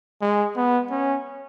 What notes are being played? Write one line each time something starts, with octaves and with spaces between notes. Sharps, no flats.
G#3
B3
C#4